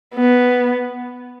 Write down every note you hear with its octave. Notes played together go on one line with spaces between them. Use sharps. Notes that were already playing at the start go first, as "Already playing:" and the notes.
B3